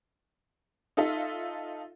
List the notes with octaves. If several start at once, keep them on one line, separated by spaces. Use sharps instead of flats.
D#4 F4 A4 D#5 E5